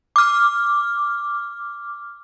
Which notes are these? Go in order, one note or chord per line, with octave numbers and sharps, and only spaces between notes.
D6 F6